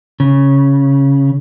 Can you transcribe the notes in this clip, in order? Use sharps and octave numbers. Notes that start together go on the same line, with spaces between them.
C#3